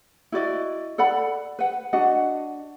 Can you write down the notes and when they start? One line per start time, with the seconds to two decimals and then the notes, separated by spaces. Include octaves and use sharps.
0.32 E4 F#4 D5 D#5
0.98 A4 D5 F#5 B5
1.59 B4 F#5
1.93 D4 F#4 D#5 F#5